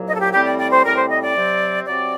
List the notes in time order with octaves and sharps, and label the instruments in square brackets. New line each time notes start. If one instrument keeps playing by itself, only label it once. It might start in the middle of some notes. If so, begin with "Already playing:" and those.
Already playing: [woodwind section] C2 A#2 F#3
D#5
A4
G4
A2 G3 C4 G4
D5
D5
C5
A2 G3 C4 A#4
C5
D#5
D5
C3 F#3 C4
C3 F#3 C4 D5